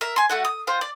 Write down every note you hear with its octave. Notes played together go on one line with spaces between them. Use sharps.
A#4 E5
G#5 C6
A3 F#4 F#5
D#6
F4 C5 G5
D5